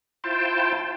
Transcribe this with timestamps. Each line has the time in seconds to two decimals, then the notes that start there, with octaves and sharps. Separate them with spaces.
0.24 E4 F4 C5 G5 A5